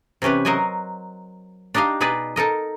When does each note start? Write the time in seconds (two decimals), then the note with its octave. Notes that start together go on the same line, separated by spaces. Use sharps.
0.22 C3 E3 C#4 G4 B4
0.45 F#3 A#4 C5 D#5 F#5 G#5
1.74 D4 D#4 G4 D#5 F5
2.00 B2 D#4 G#4 B4 D5 D#5
2.36 D#4 A4 A#4 D#5